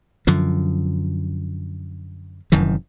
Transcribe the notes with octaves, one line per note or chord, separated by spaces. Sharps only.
F#2 D3 F3
F1 F#2 D#3 E3